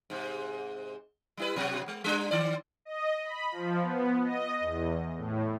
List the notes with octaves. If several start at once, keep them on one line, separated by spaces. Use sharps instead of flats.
G#2 C3
G3 E4 B4
B2 F#3 F#4
G#3
G3 D4
D#3 D5
D#5
B5
F3
B3
D#5
E2
A2